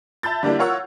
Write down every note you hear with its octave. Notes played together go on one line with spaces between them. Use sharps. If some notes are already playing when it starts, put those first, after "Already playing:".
E5 A5 B5 G6 A6
D3 G3 A#3 D4 E4
F4 A#4 C#5 F#5 E6